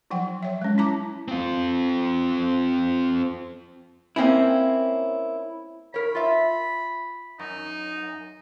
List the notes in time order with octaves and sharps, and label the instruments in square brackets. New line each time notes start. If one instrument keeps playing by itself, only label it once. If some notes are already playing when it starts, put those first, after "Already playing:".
[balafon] F3 F#3 F#5 G5
C#5 E5
G#3 C#4
E4 A5 A#5 D6
[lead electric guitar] C4 F4
[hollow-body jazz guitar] A#3 C4 C#4 E4
[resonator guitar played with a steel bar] A#4 C#5 [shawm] B5
[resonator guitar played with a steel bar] F4 E5
[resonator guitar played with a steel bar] F#2 [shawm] D#4